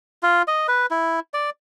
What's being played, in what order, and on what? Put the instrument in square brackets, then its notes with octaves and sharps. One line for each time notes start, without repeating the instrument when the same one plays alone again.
[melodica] F4
D#5
B4
E4
D5